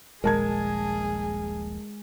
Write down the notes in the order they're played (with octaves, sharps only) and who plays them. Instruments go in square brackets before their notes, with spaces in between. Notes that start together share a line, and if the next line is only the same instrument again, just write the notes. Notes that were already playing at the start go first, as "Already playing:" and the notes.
[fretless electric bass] D#1 A#1 [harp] G#3 [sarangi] G#4 [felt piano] A#4 A5 G#6